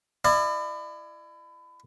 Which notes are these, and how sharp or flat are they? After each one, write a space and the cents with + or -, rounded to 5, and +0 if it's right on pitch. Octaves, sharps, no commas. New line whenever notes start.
E4 +25 D5 +40